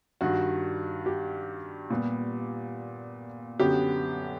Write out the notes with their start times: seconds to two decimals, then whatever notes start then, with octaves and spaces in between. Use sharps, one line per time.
0.21 G2 D#3 G3 F#4
1.06 G4
1.90 A#2 G3 B3
3.60 F#2 D3 F#3 B3 G4